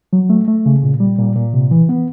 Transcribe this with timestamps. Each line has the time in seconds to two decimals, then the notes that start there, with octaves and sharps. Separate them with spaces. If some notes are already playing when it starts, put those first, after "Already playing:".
0.13 F#3
0.30 A3
0.48 A3
0.66 C#3
0.83 A#2
1.00 G3
1.19 A#2
1.36 A#2
1.54 C3
1.71 E3
1.89 B3